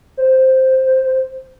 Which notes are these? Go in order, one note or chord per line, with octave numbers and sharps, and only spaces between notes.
C5